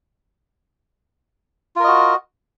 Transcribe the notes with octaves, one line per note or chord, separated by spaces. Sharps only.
F4 F#4 A#4 D#5